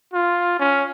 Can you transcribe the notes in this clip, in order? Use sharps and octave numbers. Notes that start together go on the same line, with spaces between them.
F4
C#4